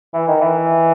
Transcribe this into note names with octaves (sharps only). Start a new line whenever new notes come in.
E3
D#3
E3